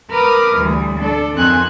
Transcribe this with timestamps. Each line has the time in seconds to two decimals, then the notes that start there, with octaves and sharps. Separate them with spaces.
0.11 A#4 B4 D6 D#6 F6
0.56 D2 E3 G3
0.99 D4 A4
1.36 F2 D#3 C4 G#5 F#6